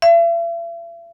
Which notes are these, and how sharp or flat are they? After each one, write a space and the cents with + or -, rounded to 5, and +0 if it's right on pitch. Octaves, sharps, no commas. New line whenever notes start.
E5 +45